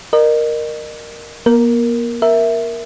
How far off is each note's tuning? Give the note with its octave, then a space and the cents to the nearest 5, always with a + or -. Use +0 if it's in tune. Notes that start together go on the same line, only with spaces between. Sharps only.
A#4 +0 D#5 -40
A#3 +45 A#4 +0
A#4 +0 E5 +0